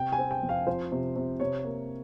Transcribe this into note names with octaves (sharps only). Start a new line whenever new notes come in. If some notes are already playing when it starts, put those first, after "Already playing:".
Already playing: C3 G5
G#5
C4
G5
F2
F5
F3 C5
C3
C3
C3 C#5
A#3